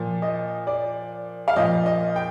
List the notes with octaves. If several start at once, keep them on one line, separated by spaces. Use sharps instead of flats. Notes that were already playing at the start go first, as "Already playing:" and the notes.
Already playing: A#2 F3
D#5
D5
F5
A#2 F3 D#5
D#5
G5